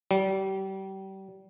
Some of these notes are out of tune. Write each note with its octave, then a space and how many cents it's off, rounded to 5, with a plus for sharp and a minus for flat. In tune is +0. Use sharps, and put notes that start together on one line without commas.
G3 -30